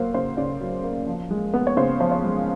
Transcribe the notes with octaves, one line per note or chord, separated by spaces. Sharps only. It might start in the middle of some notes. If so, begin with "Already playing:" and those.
Already playing: F#3 A#3 C5
C#3 C5
C#3 D5
F#3
A#3
F3
G#3
B3
C#5
C#3 C5
F3 C5
C#5
G#3